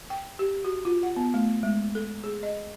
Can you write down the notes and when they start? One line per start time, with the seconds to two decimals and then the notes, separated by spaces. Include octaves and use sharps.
0.10 G5
0.39 G4
0.65 F#4
0.85 F4
1.03 F#5
1.16 B3
1.34 A3
1.63 G#3
1.95 A4
2.24 G#4
2.43 D#5